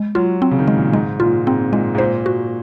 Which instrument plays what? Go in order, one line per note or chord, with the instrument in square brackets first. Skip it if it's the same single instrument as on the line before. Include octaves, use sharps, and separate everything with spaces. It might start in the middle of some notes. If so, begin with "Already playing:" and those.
Already playing: [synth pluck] G#3
[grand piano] F#3 [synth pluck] F4
[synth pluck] C4
[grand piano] C#3
D#3
[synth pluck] G#3
[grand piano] A#2
[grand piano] G#2 [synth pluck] G#3
[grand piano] A#2 [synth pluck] F4
[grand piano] G#2 [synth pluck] C4
[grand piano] A#2 [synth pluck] G#3
[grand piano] G#2
[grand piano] A#2 [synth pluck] C5
[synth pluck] F#4